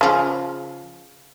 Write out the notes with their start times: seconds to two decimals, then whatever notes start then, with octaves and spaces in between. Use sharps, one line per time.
0.01 C#3 F3